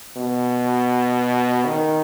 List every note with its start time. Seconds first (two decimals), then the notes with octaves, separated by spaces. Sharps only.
0.17 B2
1.66 D#3